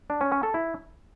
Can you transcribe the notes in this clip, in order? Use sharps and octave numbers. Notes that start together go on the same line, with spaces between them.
D4
C#4
C#4
A4
E4